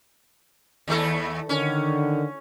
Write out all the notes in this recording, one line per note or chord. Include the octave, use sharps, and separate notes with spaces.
D#2 A3 A4
D3 D#3 C#4